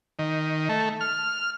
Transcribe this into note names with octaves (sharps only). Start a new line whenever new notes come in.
D#3
A3
F6